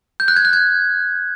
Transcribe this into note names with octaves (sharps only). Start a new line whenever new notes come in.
G6
F#6
G#6
F#6
G#6